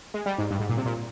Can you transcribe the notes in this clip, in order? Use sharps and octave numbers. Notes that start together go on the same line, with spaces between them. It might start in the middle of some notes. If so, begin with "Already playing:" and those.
G#3
G3
G#2
G2
G#2
A#2
C3
A#2